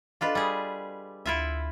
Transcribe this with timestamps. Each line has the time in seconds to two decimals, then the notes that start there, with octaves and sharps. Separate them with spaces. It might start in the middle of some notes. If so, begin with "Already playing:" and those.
0.21 D4 F4 A4 B4 D#5 F5
0.35 G3 G#4 G#5 D#6
1.26 D2 E4 F4 E5